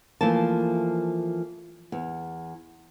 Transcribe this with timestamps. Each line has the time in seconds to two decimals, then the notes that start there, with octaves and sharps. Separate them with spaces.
0.21 E3 F3 A3 A#3 A5
1.92 E2